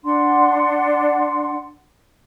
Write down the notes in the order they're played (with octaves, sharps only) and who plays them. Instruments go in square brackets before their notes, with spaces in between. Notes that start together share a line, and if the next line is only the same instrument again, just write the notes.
[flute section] D4 F#5 C6